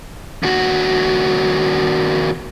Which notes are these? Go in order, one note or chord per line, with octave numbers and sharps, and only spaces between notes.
D#2 F#4